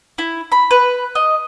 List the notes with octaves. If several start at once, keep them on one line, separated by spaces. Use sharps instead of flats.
E4
B5
B4
D#5